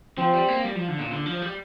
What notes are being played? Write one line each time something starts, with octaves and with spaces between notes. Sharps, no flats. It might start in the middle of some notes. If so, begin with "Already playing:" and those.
F3 C4
G3
A#3
G3
F3
D3
A#2
D3
F3
G3